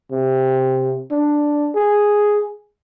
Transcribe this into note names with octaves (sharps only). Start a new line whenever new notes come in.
C3
D4
G#4